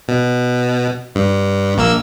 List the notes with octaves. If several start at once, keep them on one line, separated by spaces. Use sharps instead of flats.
B2
G2
A#1 A#3 E6